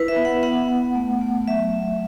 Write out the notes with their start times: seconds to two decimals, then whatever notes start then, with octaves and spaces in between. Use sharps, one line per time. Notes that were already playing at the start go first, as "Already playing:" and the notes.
Already playing: E4 B4
0.08 E5
0.16 B3
0.25 F#5
0.43 B3 F#5
0.68 B3
0.95 A3
1.21 A3
1.47 F#3 E5
1.73 F#3